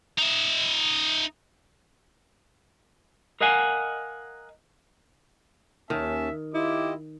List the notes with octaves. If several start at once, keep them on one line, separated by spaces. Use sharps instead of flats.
D#4 E5
A#4 D#5 F5 F#5 G#5
D#2 D#3 C#4 E5 A5
E4 F4 G4 D#5 D6